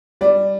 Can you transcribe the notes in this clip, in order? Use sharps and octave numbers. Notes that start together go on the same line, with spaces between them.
G3 D5